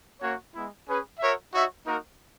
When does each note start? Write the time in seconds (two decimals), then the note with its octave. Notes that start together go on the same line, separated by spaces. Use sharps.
0.21 A#3 C#4 F#4 C#5
0.55 G#3 B3 E4
0.88 C#4 G#4 B4
1.20 F#4 A#4 C#5 E5
1.53 D#4 F#4 C#5 E5
1.86 A#3 D#4 F#4 A#4